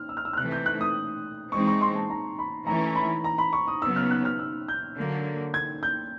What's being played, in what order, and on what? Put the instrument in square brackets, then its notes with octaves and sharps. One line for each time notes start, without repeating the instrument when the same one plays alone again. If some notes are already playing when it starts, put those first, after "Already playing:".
Already playing: [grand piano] F6
E6
F6
E6
F6
[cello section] C3 E3 A3 [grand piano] F#6
[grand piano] G6
F#6
D#6
[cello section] E3 G#3 C4 D#4 [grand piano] C#6
[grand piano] C#6
C6
A5
A#5
B5
[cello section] E3 A3 C#4 E4 [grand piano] A#5
[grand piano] B5
A#5
B5
C#6
D#6
[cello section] C#3 F#3 B3 [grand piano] E6
[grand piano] F6
F#6
F6
E6
G6
[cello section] D3 F#3 A#3
[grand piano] G#6
G6